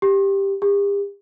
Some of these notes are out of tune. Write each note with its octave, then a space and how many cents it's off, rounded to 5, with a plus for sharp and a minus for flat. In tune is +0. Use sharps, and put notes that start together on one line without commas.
G4 +5
G4 +40